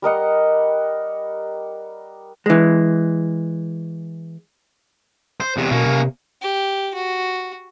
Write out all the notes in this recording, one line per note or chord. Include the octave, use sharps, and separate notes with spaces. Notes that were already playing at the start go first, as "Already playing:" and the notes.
G3 A#4 D#5 F#5
E3 G#3
C5
E2 C3
B2 A#3 C#4
C3
G4
F#4